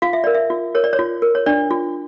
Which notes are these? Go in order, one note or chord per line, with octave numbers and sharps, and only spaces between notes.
F4 F5
E5
A#4 D5
E5
F4
A#4 C#5
D5
C#5
F4
A#4
C#5
D4 D5
F4